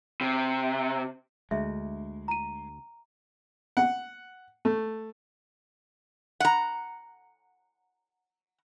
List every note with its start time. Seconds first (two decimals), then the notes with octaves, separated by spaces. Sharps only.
0.21 C3
1.51 D2 G#3 E5
2.28 A#5 D#7
3.77 F#5
4.65 A3
6.40 F#5 A#5